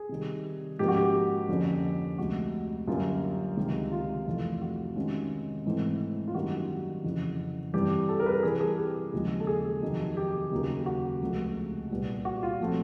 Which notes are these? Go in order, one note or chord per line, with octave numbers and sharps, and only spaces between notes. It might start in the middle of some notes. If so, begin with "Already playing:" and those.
Already playing: G#4
C3 D#3 G3
G#2 F3 A#3 C#4 G4
F#4
G4
F2 D3 F3 A#3 C#4
D2 C3 F3 G#3 F#4
F#2 D3 G3 A#3 C#4 F4
C#2 C3 D#3 G3
F4
F2 C3 E3 A3
F#4
C3 D#3 G#3 C#4
G#2 E3 A3 C4
F4
F#2 D#3 G3 A#3 F#4
F2 C#3 E3
G2 E3 G3 C4 G4
A4
A#4
B4
A#4
C3 E3 G3 G#4
G#4
G4
D#2 C#3 F3 G#3
A4
G#4
F2 C3 D#3 F#3
G4
D#2 C#3 F#3 A#3
F#4
C#2 C3 F3 A3
C2 A#2 G3 B3
F#4
F4
A#2 F3 A3 C4